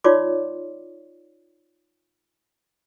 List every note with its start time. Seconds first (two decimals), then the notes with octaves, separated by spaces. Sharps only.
0.04 D#4 F4 C#5 D5 C6 D6